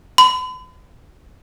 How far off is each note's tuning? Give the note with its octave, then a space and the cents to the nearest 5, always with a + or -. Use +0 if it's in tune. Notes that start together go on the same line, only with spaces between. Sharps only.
B5 +45